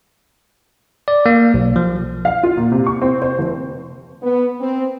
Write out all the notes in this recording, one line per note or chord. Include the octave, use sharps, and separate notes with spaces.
D5
A#3
B1
F3
F5
F4
A#2
C3
C#6
C4
C5
F1
B3
C4